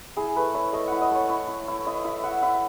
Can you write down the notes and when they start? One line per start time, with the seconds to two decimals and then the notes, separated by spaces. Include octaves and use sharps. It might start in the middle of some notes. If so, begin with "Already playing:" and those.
0.17 E4 G#4
0.36 A3 B4
0.54 E4 C#5
0.73 A3 D#5
0.88 E4 F#5
1.01 D#5
1.11 A3 C#5
1.30 E4
1.48 E4
1.68 E4
1.86 E4 D#5
2.04 E4 E5
2.23 E4 F#5
2.42 E4 E5